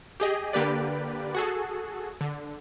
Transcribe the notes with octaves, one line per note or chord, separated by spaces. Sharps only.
G4 G#4 D#5
D3 A#3 G4 B4 D5
F#4 G#4 A4
D3